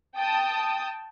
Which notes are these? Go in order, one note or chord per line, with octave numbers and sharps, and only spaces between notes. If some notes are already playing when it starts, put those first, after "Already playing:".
G5 A5 D#6